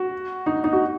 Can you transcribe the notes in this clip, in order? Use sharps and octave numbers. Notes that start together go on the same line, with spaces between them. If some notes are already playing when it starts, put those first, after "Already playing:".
Already playing: F#4
D#4
D#4
F#4